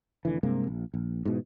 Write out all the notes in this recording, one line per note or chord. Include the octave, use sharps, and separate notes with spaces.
F1 D3 E3
G2 C3 G#3 A#3
A#1
A#1
G#2 B2 E3